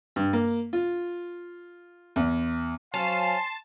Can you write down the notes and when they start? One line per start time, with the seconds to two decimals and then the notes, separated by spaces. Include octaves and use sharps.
0.16 G2
0.33 A#3
0.73 F4
2.16 E2
2.94 F#3 C#4 C5 F5 A5 C6